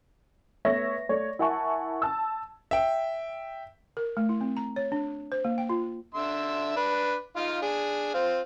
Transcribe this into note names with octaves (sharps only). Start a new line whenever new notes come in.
A3 B3 B4 C#5 E5 A#6
A3 C#5 D5
E4 A#4 F#5 G#5 A5 C#6
A5 E6
E5 G5
A#4
A3
E4
C4
A#5
C#5
D4
C5
A#3
G5
F4
D3 E5 C6
D4 B4
D#4 F4 F5
D4 G#4
C4 F4